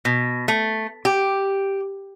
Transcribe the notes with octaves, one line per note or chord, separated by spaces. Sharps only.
B2
A3
G4